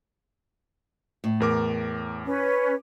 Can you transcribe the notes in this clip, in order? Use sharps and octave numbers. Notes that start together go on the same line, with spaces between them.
A2
E2 A#4 D6
C#4 B4